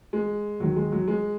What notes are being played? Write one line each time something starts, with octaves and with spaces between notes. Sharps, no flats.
G#3
D#2 D#3 F#3
G#3
F#3
G#3